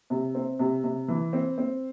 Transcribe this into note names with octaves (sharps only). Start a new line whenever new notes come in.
C3
C4
C3
C3
E3
C4
C4